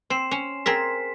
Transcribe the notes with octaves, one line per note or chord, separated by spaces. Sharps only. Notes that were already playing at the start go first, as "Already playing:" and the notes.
C4 C6 C7 E7
C#4
C4 G#4 A#4 B6